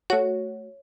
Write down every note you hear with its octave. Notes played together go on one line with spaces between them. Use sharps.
A3 F#4 C#5